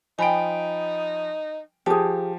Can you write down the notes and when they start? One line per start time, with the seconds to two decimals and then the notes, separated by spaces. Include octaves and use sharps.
0.19 F3 D#4 G5 G#5 B5 D7
1.86 F3 G4 G#4 A5